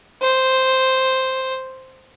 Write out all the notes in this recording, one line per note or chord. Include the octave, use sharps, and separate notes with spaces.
C5